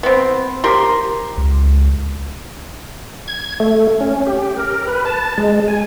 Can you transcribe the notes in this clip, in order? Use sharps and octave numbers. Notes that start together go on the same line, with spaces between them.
B3 C4
G4 A#4 C6
C#2
G#6
A3
C#4
G4
A#4
B4
A5
G#3
G#5